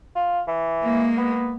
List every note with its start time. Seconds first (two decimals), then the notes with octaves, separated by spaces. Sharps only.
0.15 F4
0.47 E3
0.83 G#3 A#3
1.17 B3